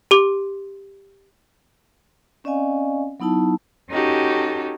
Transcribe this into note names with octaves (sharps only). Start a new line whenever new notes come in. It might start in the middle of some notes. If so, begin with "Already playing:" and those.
G4 C6 D6
C4 C#4 D5 D#5 F5 G#5
F#3 B3 D#4 E4 A5
C#4 D#4 F#4 G4 A4